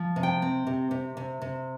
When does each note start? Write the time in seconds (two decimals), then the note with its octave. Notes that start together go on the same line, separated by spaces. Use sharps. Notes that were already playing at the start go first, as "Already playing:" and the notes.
Already playing: F3
0.16 C3
0.23 G5
0.42 C4
0.67 C3
0.91 C3
1.17 C3
1.42 C3